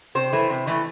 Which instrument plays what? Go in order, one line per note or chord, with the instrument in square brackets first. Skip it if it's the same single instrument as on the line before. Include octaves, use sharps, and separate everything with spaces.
[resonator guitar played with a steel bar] C3 C5
E3 A3
C3
E3 A3